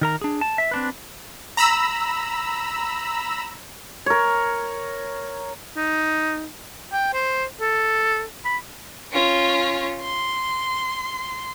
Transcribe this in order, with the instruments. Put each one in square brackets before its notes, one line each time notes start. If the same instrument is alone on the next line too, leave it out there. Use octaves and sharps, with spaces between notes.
[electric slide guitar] D#3 A#4 A#5
D4 G#4
A5
E5
C4 D4 B4
[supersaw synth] A#5 B5 E6
[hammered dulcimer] A#4 C#5
[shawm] D#4
G5
C5
A4
B5
[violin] C#4 F4
C6